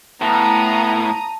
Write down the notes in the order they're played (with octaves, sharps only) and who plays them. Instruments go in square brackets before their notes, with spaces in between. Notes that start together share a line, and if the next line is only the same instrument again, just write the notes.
[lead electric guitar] A2 [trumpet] B3 [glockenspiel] A5 [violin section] A#5 D#6